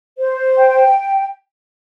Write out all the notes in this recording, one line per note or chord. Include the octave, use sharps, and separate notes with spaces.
C5
G5